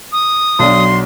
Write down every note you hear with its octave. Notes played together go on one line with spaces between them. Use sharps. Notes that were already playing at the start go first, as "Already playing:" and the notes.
D#6
B1 F#3 D4 C6